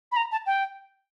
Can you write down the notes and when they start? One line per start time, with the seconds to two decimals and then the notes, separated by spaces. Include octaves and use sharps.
0.12 B5
0.17 A#5
0.32 A5
0.46 G5